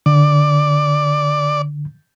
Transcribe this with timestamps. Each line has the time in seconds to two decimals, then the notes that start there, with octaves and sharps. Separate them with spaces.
0.06 D3 D5